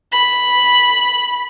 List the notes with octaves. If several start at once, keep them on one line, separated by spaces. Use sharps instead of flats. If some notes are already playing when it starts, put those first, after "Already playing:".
B5